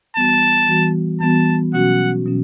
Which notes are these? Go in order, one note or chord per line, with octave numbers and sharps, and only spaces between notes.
E3 G3 B3 F#4 A5
E3 G3 B3 F#4
E3 G3 B3 F#4 A5
B2 F#3 C#4 F#4 F#5
B2 F#3 C#4